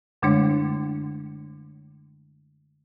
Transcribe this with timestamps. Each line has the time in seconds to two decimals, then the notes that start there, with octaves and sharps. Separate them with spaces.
0.22 F#2 D3 G#3 A3 D4 C#5